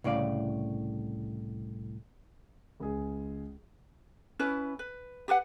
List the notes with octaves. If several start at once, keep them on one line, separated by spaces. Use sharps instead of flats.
C2 A2 C#3 D5 F5
C#2 G#4
C#4 E4 B4
B4
G4 A4 B4 F#5